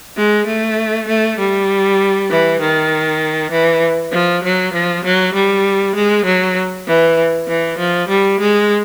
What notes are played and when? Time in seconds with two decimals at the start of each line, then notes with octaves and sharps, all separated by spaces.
0.17 G#3
0.47 A3
1.08 A3
1.39 G3
2.30 E3
2.60 D#3
3.51 E3
4.12 F3
4.43 F#3
4.73 F3
5.04 F#3
5.34 G3
5.95 G#3
6.25 F#3
6.87 E3
7.48 E3
7.78 F3
8.08 G3
8.40 G#3